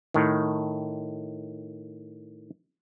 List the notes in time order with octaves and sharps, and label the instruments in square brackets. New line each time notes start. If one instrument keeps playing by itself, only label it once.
[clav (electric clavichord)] A2 D#3